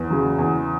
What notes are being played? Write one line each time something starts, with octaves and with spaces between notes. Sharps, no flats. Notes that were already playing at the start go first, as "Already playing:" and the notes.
Already playing: E2
C#3 F#3
E2